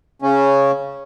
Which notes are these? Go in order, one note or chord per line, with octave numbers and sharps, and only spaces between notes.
C#3 C#4